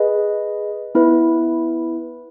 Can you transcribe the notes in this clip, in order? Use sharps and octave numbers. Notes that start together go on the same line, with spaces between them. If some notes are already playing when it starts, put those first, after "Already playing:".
Already playing: G#4 B4 D#5
B3 E4 B4